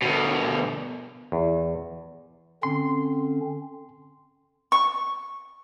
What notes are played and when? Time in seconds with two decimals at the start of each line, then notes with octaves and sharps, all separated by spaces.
0.02 D2 B2
1.32 E2
2.63 D3 C4 C#4 C6
4.72 C#6